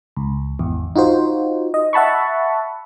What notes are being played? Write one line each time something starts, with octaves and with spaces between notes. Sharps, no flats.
C#2
G#1 E2
D#4 F4 F#4 C5
D#5
E5 F#5 A5 B5 C#6